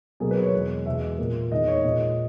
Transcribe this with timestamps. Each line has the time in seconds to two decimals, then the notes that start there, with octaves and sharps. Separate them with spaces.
0.20 B2 F#3 A#3 G#4
0.31 B4
0.42 C#5
0.53 E2 B2 G#3
0.86 E2 B2 G#3 E5
1.19 A#2 A#3
1.52 E2 D#3 G#3 D#5
1.68 C#5
1.84 A#2 G#3 D#5